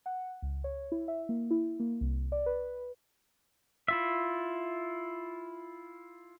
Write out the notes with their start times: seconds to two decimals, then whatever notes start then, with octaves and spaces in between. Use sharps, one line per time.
0.06 F#5
0.42 C#2
0.64 C#5
0.92 E4
1.08 E5
1.29 A#3
1.51 E4
1.80 A#3
2.01 C2
2.32 D5
2.46 B4
3.88 E4 F4 E5